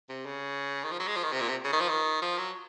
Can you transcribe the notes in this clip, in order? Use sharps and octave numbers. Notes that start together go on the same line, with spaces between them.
C3
C#3
D#3
F3
F#3
G#3
F3
D#3
C3
A#2
C3
C#3
D#3
F3
D#3
F3
F#3